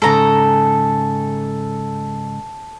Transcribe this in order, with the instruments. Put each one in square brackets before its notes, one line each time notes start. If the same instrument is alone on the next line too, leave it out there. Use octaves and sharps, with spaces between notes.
[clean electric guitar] G#2 C#3 [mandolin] A4 A#5